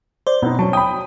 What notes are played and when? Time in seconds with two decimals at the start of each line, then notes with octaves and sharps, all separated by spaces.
0.27 C5 D5
0.42 B2 B3 C4 D#4
0.59 F#3 C#4 A5
0.73 G5 B5 D#6